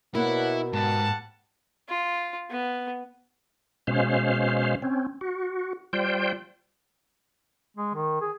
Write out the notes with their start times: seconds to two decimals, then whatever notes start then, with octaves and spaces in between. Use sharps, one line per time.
0.15 B2 A#3 E4 C#5 D5 F#5
0.73 G#2 G3 F#5 A5
1.89 F4
2.50 B3
3.87 B2 G#3 C#4 C5 F5
4.82 C4 C#4
5.21 F#4
5.93 G3 F4 C5 G5
7.77 G#3
7.95 D#3
8.21 G#4